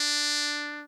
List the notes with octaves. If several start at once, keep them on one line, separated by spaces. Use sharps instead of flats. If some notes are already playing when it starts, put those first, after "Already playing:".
Already playing: D4